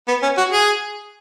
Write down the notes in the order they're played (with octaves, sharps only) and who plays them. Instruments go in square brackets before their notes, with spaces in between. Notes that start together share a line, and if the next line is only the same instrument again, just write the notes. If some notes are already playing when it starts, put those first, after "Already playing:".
[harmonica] B3
C#4
F#4
G#4